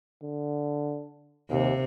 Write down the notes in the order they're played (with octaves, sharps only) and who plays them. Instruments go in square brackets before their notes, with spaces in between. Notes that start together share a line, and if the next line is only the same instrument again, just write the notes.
[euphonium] D3
[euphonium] D#2 [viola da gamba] C3